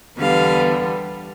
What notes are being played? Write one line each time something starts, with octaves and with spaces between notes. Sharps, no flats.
E2 D3 G3 B3 F5